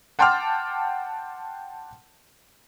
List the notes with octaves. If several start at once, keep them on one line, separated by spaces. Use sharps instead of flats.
F#5 G5 A5 C6 D6 F6